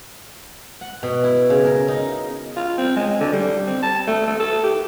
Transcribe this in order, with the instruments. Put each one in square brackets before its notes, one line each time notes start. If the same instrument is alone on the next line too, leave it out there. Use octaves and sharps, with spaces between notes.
[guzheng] F#5
B2
E4
C#3
A#4
D#4
[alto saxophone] F4
C4
G#3
D3
G3
C4
A5
A3
A3
A4
G4